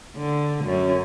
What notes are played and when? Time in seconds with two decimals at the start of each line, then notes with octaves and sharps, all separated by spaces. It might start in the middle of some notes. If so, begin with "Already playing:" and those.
0.16 D3
0.65 F#2